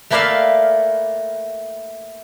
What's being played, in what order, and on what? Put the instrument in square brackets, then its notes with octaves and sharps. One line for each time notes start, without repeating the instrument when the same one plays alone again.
[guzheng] A3 A#3 B4 D5 E5 F5